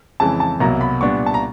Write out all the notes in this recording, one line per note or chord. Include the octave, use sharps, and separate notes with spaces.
F2 C#3 E3 G#3 A5
A5
C2 B2 F#3 A#3 A#5
B5
A#2 G3 B3 D4 C#6
A5
A#5